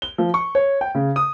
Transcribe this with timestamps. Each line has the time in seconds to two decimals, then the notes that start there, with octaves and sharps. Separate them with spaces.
0.02 G7
0.18 F3
0.34 C#6
0.55 C#5
0.81 G5
0.95 C#3
1.16 D#6